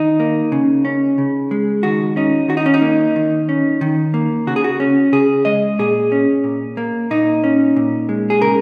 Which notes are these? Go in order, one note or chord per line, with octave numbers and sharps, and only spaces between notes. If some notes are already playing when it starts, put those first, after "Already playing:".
Already playing: D#3 D#4
A#3
C#3
C#4
C#3
G#3
D#3 F#4
C#4 D#4
D#3 F#4
D#4
C#4
D#4
A#3
D#3
C#4
D#3
A#3
C#3 F#4
G#4
F#4
C#4
C#3 G#4
G#3 D#5
A#2 G#4
C#4
A#2
A#3
A#2 D#4
C#4
A#2
G#3
G#4
C#3 A#4